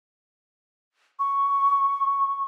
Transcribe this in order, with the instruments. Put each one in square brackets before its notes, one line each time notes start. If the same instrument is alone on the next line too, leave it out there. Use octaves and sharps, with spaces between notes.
[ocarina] C#6